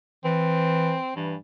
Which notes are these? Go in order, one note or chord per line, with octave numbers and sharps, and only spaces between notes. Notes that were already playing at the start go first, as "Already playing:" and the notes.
E3 C4
G2 E3